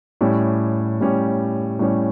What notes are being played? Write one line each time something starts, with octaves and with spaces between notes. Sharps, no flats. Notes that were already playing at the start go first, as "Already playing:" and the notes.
A2 G3 C#4 G4
A2 G3 C#4 G4
A2 G3 C#4 G4